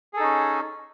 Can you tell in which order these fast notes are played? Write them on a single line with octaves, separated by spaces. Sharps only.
G#4 A4 D#4 C#4